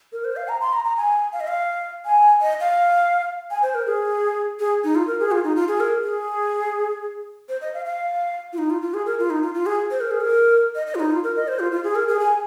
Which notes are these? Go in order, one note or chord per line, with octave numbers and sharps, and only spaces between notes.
A#4
C5
F5
A#5
C6
A#5
A#5
G#5
F5
D#5
F5
G#5
D#5
F5
G#5
C5
A#4
G#4
G#4
D#4
F4
A#4
G#4
F4
D#4
F4
G#4
A#4
G#4
C5
D#5
F5
F5
F4
D#4
F4
F4
G#4
A#4
F4
D#4
F4
F4
G#4
C5
A#4
G#4
A#4
D#5
D#5
F4
D#4
F4
A#4
D#5
C5
F4
F4
G#4
A#4
G#4
G#5